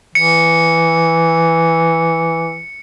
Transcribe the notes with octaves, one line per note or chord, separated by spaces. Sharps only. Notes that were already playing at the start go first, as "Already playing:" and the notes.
E3 C#7